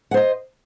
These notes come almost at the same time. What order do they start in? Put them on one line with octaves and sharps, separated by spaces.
F#5 C5 D#5